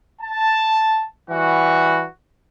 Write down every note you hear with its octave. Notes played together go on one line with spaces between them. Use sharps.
A5
E3 G3 F#4